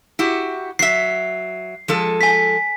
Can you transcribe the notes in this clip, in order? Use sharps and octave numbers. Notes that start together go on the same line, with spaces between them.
E4 F#4 G4
F#3 E5 C7
F3 G#3 A4
G#5 B6